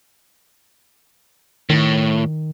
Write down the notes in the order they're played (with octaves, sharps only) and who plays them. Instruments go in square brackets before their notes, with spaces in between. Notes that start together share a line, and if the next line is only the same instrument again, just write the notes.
[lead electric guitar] A2 [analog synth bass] D#3